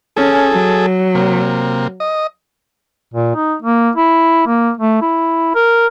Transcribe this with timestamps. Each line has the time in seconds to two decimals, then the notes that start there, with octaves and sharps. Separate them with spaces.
0.16 C#4 G#4 A4
0.52 F#3
1.15 C3 A#3
2.00 D#5
3.14 A#2
3.35 D#4
3.62 A#3
3.96 E4
4.47 A#3
4.78 A3
5.02 E4
5.55 A#4